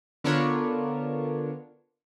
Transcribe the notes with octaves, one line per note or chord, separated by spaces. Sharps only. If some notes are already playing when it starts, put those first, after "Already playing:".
D3 B3 D4 F4 A#4 C#5